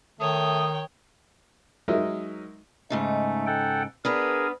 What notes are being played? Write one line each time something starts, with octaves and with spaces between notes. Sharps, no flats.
D#3 A3 C#5 G5 D#6
F#3 G#3 D#4 A#4 D#5 E5
G#2 C#3 A3 D#4
A4 F#5 G5
B3 D4 G#4 A#4 B4